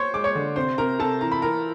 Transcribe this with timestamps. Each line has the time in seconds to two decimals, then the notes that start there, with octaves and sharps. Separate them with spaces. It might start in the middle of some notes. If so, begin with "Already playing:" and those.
Already playing: C5 C#5 C6 C#6
0.14 G#3 D6
0.24 C#5 C#6
0.35 D3
0.56 C3 C5 C6
0.78 C3 A#4 A#5
0.99 C3 A4 A5
1.21 E3 A#5
1.32 B5
1.42 E3 A#4 A#5